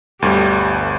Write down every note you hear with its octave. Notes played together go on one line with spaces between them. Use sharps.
G1 D2 G3